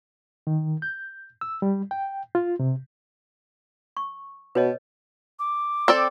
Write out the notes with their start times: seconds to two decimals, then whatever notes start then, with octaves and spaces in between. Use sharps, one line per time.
0.47 D#3
0.82 G6
1.41 E6
1.62 G3
1.91 G5
2.35 F4
2.60 C3
3.97 C#6
4.55 B2 B4 C#5 D#5
5.39 D6
5.88 C4 A4 D5